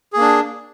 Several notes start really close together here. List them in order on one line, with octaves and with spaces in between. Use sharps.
G#4 A#3 D4